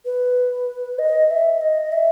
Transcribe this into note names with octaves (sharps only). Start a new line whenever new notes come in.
B4
D#5
E5
D#5
E5